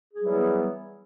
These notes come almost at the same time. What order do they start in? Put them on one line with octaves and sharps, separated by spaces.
G#4 F#3 G3 E3 B3